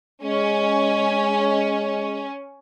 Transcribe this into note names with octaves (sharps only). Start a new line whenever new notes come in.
G#3 C#4